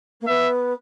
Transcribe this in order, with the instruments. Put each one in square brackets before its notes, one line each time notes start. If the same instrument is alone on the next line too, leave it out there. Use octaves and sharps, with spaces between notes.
[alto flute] A#3
[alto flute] B3 [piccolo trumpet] E5